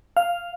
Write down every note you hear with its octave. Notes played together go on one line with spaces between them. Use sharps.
F5